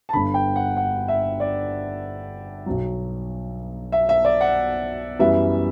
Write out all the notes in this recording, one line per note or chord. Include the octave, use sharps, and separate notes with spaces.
A5
G1 G2 D3 B5
G5
F#5
F#5
E5
D5
B1 B2 F#3
E5
E5
D5
F#5
F#2 E3 G3 B3 E5